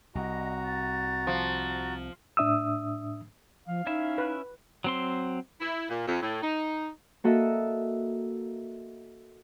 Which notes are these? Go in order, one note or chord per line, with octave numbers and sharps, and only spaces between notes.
C2 F#4 D#5 A#5
A6
F3
A2 D4 E5 D#6 E6
F3 F5
C#4 D#4 E4 E5
B4
F#3 C4 C6
E4
A#2
F2
A2
D#4
A#3 F#4 A4 D#5 E5